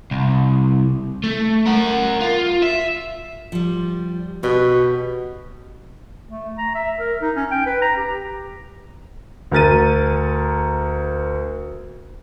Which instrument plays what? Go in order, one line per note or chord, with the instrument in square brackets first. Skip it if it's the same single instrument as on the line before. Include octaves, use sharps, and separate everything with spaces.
[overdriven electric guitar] C2
A3
A#4 F#5
F4
E5
[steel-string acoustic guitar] F3 G3
[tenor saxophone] B2 [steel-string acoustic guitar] G4 C#5
[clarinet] A3
A#5
E5
A#4
D#4
C#4
G5
B4
A#5
G4
[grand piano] D2 A#4 A6 D#7